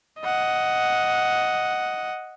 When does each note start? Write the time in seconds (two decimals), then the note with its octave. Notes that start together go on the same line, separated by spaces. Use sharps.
0.21 D#5 F#5